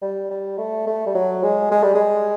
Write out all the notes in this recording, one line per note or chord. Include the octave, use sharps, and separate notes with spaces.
G3
G3
A3
A3
G3
F#3
G#3
G#3
G3
G#3